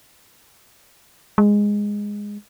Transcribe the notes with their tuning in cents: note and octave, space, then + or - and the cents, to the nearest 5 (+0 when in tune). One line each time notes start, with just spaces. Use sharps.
G#3 -10